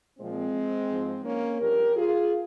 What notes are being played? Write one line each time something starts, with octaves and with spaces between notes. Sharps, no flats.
A#2 F3 G#3 C4
G#2 F3
A#3 C#4
G2 F3 G4 A#4
F4 G#4